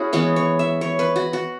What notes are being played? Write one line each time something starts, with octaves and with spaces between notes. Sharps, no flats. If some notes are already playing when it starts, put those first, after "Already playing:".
Already playing: C#4 E4 F#4 G#4
E3 G#3 B3 C#5
C#5
E5
C#5
B4
F#4
F#4